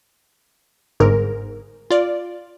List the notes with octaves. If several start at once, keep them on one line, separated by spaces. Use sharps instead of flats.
G1 G#2 A#4
F4 D5